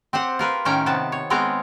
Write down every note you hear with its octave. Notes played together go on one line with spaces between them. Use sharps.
C4 G4 C5 F#5
F4 A#4 B4
A2 D#3 C#4 A#4 G5 A#5
C3 B3 A5
C#5
G#3 B3 C4 A#4 C#5 A#5